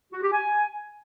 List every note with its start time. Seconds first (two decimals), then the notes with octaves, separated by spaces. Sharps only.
0.13 F#4
0.23 G4
0.32 G#5